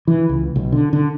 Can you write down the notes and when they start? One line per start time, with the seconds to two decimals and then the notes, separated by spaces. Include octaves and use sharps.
0.08 E3
0.29 C#2
0.56 B1
0.72 D3
0.93 D3